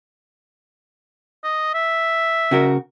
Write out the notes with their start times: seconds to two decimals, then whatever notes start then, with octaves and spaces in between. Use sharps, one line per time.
1.44 D#5
1.74 E5
2.51 C#3 F#4 A#4